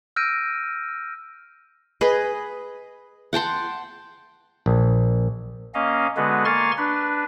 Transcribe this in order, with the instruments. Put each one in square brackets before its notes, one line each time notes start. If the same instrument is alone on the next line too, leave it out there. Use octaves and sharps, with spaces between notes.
[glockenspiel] E6 F6 G6 A#6 D7 D#7
[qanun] G#4 B4 D#5 B5
F#5 G5 A5 C6
[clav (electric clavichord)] A#1
[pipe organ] A#3 C#4 D#5 F5
D3 G#3 B3 F#4 B4
A#3 G#5 C6 C#6 F6 A6
D4 B4